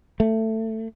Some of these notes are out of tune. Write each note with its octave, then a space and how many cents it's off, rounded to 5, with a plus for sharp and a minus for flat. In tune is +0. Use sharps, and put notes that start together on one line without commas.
A3 +15